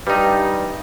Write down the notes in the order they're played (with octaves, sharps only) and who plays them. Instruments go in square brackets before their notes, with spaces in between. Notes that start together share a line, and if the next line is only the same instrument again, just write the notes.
[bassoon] G2 [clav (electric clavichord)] G3 D#4